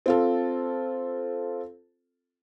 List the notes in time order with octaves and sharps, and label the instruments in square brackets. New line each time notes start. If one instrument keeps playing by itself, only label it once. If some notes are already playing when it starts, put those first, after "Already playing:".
[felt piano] C4 F4 A4